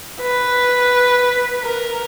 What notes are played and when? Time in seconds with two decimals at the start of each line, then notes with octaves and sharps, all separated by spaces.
0.21 B4
1.63 A#4